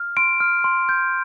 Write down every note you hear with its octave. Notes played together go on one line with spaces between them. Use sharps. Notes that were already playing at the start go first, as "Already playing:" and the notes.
Already playing: F6
C6 D7
F6
C6
G6